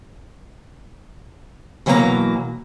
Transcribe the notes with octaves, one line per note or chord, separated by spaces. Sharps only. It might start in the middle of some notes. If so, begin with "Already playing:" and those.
B2 E3 F#3 A#3 B4 A#5